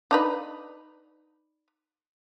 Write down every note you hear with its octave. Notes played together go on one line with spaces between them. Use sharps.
D4 D#4 B4